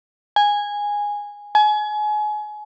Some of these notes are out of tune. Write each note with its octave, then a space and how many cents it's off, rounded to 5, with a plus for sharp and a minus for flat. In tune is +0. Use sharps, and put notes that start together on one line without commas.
G#5 -10
G#5 +30